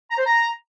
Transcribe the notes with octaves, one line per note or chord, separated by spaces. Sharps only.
A#5
C5
A#5